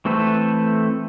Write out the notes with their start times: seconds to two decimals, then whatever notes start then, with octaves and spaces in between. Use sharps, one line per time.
0.05 E3 A3 C4 A4 B4